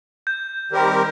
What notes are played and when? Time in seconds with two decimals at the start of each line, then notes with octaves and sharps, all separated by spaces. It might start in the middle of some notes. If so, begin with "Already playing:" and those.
0.27 G6
0.71 D#3 G3 C4 G4 A#4